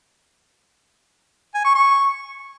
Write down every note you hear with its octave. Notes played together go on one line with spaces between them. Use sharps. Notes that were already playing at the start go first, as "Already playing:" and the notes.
G#5
C#6
C#6